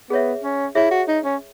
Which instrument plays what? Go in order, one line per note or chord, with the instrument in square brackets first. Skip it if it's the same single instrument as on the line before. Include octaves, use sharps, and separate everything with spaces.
[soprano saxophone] B3 [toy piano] G#4 C#5 E5
[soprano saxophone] C#4
[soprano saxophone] E4 [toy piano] G#4 C#5 E5
[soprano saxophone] F#4
D#4
C#4